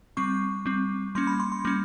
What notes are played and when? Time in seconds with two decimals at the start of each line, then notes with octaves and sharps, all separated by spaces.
0.17 G3 C4 C#6
0.66 G3 C4
1.15 G3 A#3 C#4 C6
1.27 B5
1.40 C6
1.52 C6
1.65 G3 A#3 C#4